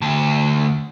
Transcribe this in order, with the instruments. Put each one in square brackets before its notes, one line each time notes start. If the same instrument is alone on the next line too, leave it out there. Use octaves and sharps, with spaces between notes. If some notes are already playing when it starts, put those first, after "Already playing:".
[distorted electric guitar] D2 A5